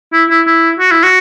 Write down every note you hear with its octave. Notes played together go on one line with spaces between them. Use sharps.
E4
E4
E4
F#4
E4
F#4